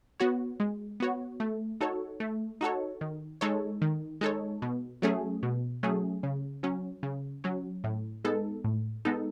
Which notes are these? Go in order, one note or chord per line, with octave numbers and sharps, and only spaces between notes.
B3 F#4 C#5
G#3
B3 F#4 C#5
A3
D#4 F#4 A4 C#5
A3
D#4 F#4 A4 C#5
D#3
G#3 D#4 A4 C#5
D#3
G#3 D#4 A4 C#5
B2
F#3 A3 C#4 G#4
B2
F#3 A3 C#4 G#4
C#3
F#3 C#4
C#3
F#3 C#4
A2
G#3 B3 D#4 A4
A2
G#3 B3 D#4 A4